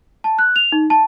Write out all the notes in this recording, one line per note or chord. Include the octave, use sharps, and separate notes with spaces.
A5
F#6
F7
D#4
A5